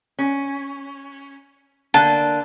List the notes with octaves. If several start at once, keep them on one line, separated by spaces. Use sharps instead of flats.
C#4
D3 A#3 A5